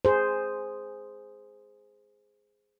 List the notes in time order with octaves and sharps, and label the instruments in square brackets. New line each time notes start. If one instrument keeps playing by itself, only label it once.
[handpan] G#4 C5